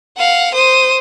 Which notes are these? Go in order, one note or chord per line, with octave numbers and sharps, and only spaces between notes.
F5 F#5
C5 D#6